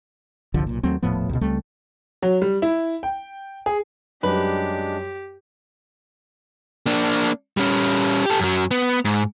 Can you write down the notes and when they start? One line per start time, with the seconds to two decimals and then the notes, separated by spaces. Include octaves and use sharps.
0.54 G1 C2 D3 F3
0.67 B1 A#2
0.83 D#2 F#3 A3 C4
1.03 D#1 A2 F3 B3
1.29 C#2 B2
1.41 C#2 G3 A3 C4
2.22 F#3
2.42 G3
2.62 E4
3.03 G5
3.66 G#4
4.23 F#2 G3 G#3 D4 G4 B4
6.86 A#3 D4
7.57 G3 C#4
8.26 G4 A4
8.40 F#2 F#3
8.71 B3
9.05 G#2